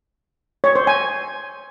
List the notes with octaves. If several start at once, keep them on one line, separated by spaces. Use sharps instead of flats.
C#5
C5
G#5